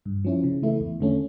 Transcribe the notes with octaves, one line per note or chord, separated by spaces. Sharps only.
G2
F3 C#4 E4
C#3
E3 A3 E4
E2
D3 A3 C#4